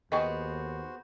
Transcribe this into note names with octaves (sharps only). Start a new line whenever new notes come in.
D#2 B3 F#4 G#4 C5 D#5 G5 C#6